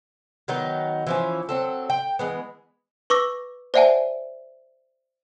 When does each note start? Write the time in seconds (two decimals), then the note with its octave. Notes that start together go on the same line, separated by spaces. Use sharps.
0.48 D#3 F#3 B3 D#4
1.07 E3 F3 C#4
1.49 F#3 C4 A4
1.90 G5
2.19 E3 G#3 B3
3.10 B4 C#6 D6 E6 A#6
3.74 C5 D5 E5 F#5 G#5 A5